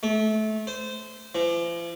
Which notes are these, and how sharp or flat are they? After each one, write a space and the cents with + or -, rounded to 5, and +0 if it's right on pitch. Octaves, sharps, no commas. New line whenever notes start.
A3 -25
C5 -20
F3 -45